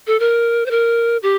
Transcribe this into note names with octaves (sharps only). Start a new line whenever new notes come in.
A4
A#4
C5
A#4
G4